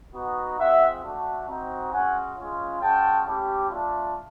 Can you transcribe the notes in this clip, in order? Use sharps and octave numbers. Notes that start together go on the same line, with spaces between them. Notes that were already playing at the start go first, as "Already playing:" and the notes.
B3 D#4 F#4
G#3 C4 F4 E5 F#5
A3 D4 F#4
C4 D#4 F#4
G#3 C#4 F#4 F#5 G#5
G#3 C#4 F4
G#3 C#4 F#4 G5 A5
A3 C#4 E4 G4
A3 D4 F4